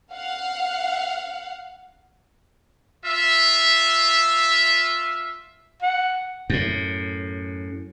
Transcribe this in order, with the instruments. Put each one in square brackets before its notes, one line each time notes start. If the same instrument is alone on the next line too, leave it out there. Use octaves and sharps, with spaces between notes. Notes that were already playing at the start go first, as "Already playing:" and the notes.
[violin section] F5 F#5
[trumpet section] F4 E5
[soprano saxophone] F#5
[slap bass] F#2 A2